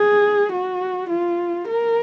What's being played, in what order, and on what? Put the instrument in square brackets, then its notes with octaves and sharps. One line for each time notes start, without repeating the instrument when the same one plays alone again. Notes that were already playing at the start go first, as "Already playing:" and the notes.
Already playing: [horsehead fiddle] G#4
F#4
F4
A#4